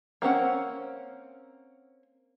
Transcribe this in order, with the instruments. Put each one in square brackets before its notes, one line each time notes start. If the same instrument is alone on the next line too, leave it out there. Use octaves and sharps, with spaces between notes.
[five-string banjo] A#3 C4 C#4 F#5